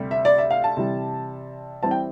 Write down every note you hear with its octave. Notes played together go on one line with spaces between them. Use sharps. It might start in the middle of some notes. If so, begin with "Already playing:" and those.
Already playing: D2 C3 G3
E5
D5
E5
F5
A5
C3 E3 G3
E3 G3 C4 A5
G5